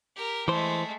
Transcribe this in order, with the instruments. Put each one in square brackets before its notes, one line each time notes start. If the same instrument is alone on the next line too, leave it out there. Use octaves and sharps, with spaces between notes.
[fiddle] G4 A#4
[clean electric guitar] E3 C5 [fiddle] G#3 A3